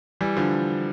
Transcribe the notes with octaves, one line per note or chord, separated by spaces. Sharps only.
E3 G3
D3 F3